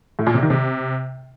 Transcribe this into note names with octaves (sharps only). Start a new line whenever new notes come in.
A2
A#2
C3
D#3
C3